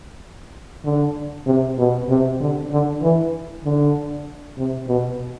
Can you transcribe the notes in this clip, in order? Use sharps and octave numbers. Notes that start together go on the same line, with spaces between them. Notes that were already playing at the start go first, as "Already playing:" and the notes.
D3
C3
B2
C3
D3
D3
E3
D3
C3
B2